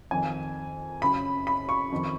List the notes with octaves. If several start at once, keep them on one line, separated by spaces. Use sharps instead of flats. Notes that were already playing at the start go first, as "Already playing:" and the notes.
F2 D#3 G#5
F#2 C#3 B5
B5
C#6
F2 D#3